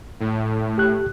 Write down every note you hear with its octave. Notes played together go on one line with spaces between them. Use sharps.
A2
G4 F#6